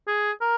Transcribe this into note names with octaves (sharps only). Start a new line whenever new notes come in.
G#4
A#4